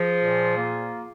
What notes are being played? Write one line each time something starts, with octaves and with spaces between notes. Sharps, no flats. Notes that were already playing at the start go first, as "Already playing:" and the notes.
Already playing: F3 F4 G#4
A#2
A#3